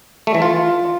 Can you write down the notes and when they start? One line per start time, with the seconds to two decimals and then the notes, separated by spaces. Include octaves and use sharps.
0.27 A3
0.34 E3
0.42 F4